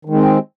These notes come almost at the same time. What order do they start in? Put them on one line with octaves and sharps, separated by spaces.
D#3 G#3 C4